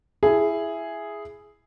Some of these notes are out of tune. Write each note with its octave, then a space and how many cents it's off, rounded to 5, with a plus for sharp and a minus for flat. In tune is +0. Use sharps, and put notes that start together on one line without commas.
E4 +10 G#4 +0